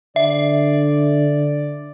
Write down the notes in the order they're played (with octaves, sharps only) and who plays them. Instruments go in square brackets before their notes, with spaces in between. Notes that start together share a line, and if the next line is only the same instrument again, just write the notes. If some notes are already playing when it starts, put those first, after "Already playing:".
[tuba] D3 [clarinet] D5 [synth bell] E5